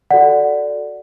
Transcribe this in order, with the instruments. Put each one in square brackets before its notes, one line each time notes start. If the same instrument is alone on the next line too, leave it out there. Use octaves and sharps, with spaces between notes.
[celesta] F#4 A4 D5 F#5